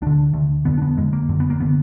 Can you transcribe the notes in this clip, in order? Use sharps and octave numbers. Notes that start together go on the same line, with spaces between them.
D2 D3 D4
D2 D3
F2 D3 B3
D4
B3
F2 D3 G#3
A#3
F#2 D3
B3
A#3
D3 B3